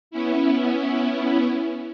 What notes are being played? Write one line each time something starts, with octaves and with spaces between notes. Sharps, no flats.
B3 C#4 E4